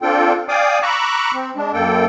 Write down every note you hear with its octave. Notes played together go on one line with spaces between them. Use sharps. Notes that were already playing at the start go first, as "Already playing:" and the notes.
C4 D4 F4 A4 G5
D5 F5 G5 G#5 D6 D#6
A#5 B5 C#6 D6 E6 F#6
C4
G#3 D4
F#2 A#3 A4 G5